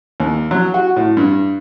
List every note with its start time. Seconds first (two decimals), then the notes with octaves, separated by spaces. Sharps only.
0.20 D#2
0.51 F#3
0.74 F#4
0.96 A2
1.17 G2